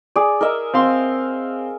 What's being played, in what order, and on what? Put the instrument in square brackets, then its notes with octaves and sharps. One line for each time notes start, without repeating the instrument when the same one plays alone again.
[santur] G#4 D5
A#4 D#5 E5
[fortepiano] C4 F5 C6